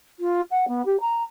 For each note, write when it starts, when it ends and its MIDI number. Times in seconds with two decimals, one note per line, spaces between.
0.20 0.41 65
0.51 0.65 78
0.68 0.82 59
0.85 1.00 67
1.00 1.23 82